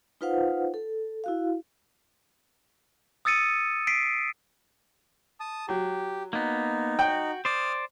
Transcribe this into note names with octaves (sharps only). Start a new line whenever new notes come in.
D#4 F4 B4 C5 F5 F#5
A4
E4 F#4 F5
D#6 E6 A6 C#7 D#7
B6 C7 D7 D#7
A5 D#6
F#3 G4
A#3 B3 D#4
F#4 G5
C5 D5 D#6 F6